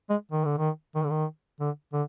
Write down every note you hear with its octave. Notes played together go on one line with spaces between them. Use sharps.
G#3
D#3
D3
D#3
D#3
D3
D#3
D3
D3